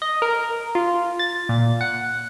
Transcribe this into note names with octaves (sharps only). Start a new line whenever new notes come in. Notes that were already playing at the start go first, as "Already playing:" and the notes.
D#5
A#4
F4
A6
A#2
F#5